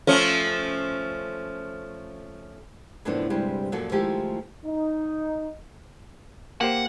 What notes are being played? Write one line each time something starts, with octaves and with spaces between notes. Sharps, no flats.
F3 A3 C#4
F#2 A2 D3 F3 B3 D4
D2 G2 C3 G3 G#3 D4
F#2 A#2 F3 F#4 A4
D#3 F3 G#3 A3 E4 G4
D#4
A#3 G4 C5 F#5